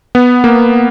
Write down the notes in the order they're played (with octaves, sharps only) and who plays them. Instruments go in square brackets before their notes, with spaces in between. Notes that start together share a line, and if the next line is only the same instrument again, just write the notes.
[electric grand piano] B3
A#3